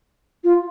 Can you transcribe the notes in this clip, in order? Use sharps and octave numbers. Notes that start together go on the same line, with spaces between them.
F4